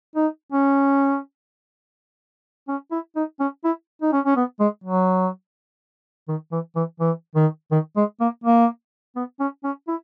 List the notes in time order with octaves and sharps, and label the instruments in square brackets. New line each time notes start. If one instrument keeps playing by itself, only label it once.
[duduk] D#4
C#4
C#4
E4
D#4
C#4
E4
D#4
C#4
C#4
B3
G#3
F#3
D#3
E3
E3
E3
D#3
D#3
G#3
A#3
A#3
B3
C#4
C#4
E4